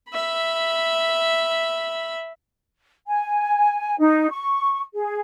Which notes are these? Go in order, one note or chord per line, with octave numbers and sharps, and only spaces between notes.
E5 B5
G#5
D#4
C#6
G#4